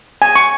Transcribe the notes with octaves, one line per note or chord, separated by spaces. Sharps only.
G#5
C#6